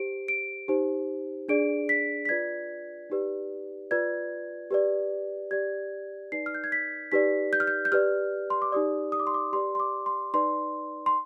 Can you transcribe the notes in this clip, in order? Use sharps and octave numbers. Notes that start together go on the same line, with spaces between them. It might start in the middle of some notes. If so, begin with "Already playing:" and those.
Already playing: G4 C5 D7
D7
D#4 G4 C5
D4 G#4 D5 D7
B6
B6
F4 B4 D5 G#6
D#4 G4 B4 D5
F4 B4 D5 G#6
G4 B4 D5
G4 D5 G#6
D#4 B4 D5 C7
F6
G6
G#6
B6
D#4 G4 B4 D5 B6
G6
F6
G6
G6
G4 B4 D5 F6
C6
D6
D#4 G4 D5 D#6
D#6
D6
C6
D6
G4 B4 D5 C6
C6
D6
C6
D#4 B4 D5 C6
C6